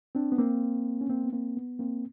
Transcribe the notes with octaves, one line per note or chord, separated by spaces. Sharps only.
C4 D4
B3
A#3 C4
C#4
A#3 C4
B3
A#3 C4
B3
A#3 C4